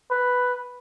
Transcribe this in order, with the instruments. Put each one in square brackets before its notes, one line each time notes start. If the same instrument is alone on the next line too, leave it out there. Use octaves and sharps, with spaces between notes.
[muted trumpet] B4